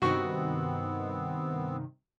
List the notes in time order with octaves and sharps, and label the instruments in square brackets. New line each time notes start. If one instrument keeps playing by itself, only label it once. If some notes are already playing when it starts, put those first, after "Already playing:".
[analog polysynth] G2 C3 D#3 [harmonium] B3 C4 [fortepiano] F#4 C#6